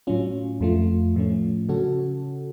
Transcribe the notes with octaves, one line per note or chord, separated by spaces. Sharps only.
A2 F#3 C#4 F4
F2 F3 A3 F4
A2 F3 A3 C#4
C#3 F#3 C#4 F#4 A4